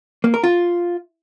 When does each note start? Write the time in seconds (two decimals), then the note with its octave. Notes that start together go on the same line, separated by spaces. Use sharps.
0.24 A#3
0.34 A#4
0.44 F4